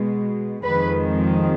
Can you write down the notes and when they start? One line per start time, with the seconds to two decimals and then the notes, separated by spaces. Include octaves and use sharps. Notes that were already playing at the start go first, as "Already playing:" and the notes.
Already playing: B2 G#3
0.62 F2 D#3 G#3 B4